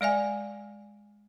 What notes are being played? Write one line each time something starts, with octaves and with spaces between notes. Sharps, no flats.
G#3 D5 E5 G#5